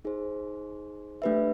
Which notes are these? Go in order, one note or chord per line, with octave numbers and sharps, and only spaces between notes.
D#4 G#4 C5
A3 D4 G4 B4 E5